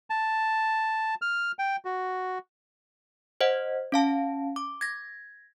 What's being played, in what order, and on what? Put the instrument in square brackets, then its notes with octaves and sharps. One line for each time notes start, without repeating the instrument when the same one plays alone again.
[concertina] A5
F6
G5
F#4
[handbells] C5 D#5 F#5
C#4 F5 A5
D6
G#6 A#6